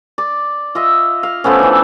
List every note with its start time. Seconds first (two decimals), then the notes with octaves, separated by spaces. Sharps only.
0.18 D5
0.75 F4 D#5 E5
1.23 F5
1.44 F3 A3 B3 C#4
1.59 E3 D4